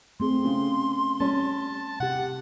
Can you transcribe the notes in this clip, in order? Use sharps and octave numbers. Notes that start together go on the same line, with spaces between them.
A3 C4 G#4 C6
C#3
G3 C#4 A5
C3 G4 F#5